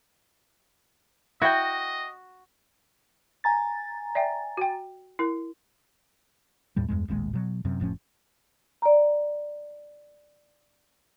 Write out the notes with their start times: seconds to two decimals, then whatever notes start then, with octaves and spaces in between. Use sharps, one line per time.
1.42 E4 F#4 D#5 G5
3.44 G#5 A#5 A6
4.15 D5 E5 G5
4.57 F#4 G5
5.19 E4 A#4
6.76 D#2 A2 G3
6.89 E2 G2 G#3
7.08 D#1 A1 D#2 G#3
7.33 B2 F#3
7.65 F#2 C3
7.80 F1 A2 F3 C#4
8.82 D5 A#5